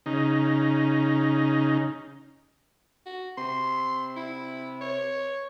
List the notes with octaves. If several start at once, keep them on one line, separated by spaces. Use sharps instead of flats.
C#3 D#4
F#4
C3 C6
E4
C#5